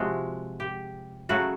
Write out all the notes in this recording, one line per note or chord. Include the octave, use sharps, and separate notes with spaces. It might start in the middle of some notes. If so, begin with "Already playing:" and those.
Already playing: C3 F3 G#3 F#4
G4
C#3 F#3 A3 F#4